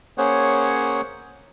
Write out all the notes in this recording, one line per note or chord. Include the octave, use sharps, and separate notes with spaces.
A#3 C#4 G#4 C5 C#5 F#5